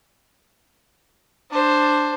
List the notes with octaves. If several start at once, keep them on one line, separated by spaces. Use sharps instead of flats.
D4 C5